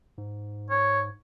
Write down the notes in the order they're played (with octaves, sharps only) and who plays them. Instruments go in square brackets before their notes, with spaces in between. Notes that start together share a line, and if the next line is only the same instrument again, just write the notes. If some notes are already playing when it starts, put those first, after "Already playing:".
[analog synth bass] G#2
[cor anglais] C#5